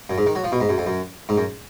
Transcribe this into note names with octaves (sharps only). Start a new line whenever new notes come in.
F#2
G#2
D#3
F#3
F3
B2
G#2
F#2
F2
F#2
G#2
F#2